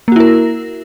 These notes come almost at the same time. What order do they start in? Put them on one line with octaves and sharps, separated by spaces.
A#3 F#4 E4 A#4